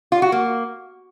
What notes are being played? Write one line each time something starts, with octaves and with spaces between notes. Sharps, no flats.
F4
F#4
A#3